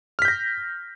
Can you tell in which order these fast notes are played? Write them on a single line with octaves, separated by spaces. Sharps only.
F6 B6 G6 A#6